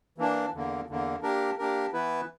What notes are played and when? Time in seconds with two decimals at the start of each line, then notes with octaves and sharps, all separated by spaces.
0.18 E3 A#3 D4
0.53 E2 D3 A#3
0.88 E2 D3 A#3
1.23 A#3 D4 G4 A#4
1.58 A#3 D4 G4 A#4
1.93 E3 B3 E4 B4